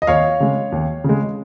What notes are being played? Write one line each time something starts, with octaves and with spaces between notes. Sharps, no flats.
D#5
D#2 C#5 F5
C#3 G#3
D#2
C#3 G#3